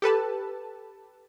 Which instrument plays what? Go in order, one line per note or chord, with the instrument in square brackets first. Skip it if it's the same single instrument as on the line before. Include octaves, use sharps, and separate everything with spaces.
[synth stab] G4 A4 B4 A5